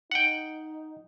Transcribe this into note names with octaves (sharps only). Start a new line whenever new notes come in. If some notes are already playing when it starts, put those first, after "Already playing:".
D#4 F#5 G5